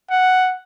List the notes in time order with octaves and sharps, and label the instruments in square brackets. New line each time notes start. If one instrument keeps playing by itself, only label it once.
[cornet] F#5